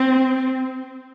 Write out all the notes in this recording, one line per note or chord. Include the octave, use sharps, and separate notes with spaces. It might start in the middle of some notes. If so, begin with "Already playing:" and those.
Already playing: C4